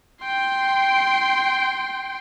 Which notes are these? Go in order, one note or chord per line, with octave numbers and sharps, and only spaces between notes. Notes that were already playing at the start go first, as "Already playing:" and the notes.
G5 C6